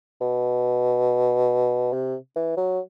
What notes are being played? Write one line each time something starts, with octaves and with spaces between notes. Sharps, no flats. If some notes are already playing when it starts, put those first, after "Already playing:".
B2
C3
E3
F#3